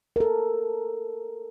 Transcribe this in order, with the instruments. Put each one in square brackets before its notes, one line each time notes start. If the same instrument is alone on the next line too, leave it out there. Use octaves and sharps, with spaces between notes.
[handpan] A4 A#4